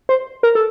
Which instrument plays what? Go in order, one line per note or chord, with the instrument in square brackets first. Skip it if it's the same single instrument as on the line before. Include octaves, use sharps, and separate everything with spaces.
[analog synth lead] C5
A#4
A4